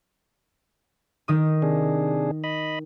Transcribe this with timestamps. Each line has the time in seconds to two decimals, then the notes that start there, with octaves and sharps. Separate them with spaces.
1.28 D#3 D#6
1.62 C3 D4 G#4
2.44 D#5 B5